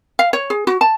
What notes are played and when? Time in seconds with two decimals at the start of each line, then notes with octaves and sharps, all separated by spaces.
0.19 F5
0.33 C#5
0.50 G#4
0.67 F#4
0.81 A5